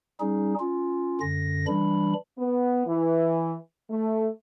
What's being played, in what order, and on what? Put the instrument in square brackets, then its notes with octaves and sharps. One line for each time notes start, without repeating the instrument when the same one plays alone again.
[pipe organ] G3 C#4 D#4 G#4
C#4 F4
F#2 D3 A#6
E3 G3 D4 B5
[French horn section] B3
E3
A3